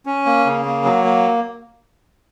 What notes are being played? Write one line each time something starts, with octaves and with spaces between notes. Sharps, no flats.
C#4
A#3
C#3
A#3
F#3
A#3